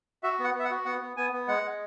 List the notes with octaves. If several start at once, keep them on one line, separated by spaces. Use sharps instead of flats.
F#4 E5
B3
F#5
B3 E5
F#5
F#4
B3 F#5
B3
B3 G#5
B3
G#3 F#5
G#3